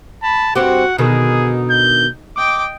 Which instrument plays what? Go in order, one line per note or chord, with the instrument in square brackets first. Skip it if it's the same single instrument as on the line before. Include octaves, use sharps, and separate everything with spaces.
[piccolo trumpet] A5 [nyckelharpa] B5
[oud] G2 C4 G4 [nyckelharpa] F#4 [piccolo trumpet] F#5
[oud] B2 D3 D#3 [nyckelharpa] D#4 [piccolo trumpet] G#4
[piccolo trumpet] G6
[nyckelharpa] D#5 G5 [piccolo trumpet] D6